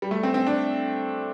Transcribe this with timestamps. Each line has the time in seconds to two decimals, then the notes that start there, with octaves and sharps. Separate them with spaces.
0.02 G3
0.11 A3
0.23 C4
0.34 C4
0.47 D4